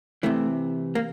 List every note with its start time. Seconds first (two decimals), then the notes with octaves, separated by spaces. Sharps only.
0.23 C3 E3 A3
0.95 A#3